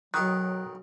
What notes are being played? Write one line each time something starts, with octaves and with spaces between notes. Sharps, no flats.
B1 D#3 F#3 G4 A#5 C#6 F#6